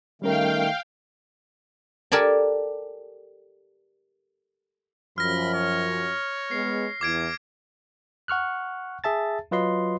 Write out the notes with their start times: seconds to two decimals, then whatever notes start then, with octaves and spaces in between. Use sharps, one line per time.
0.22 D#3 G3 A3 C#4 A#4 F5 G5
2.12 G4 A4 A#4 D5 G#5 A5
5.18 F#2 F3 B5 F6 A#6
5.54 C#5
6.51 G#3 B3 C7
7.01 E2 E4 D6 G#6 D7
8.28 F#5 C#6 F6 F#6
9.04 G#4 E5 A5 A6
9.51 F#3 F4 B4 D#5 C6